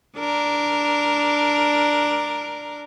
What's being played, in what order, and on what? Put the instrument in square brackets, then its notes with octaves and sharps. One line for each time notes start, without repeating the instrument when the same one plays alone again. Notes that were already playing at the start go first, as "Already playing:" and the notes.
[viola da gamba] D4 A#4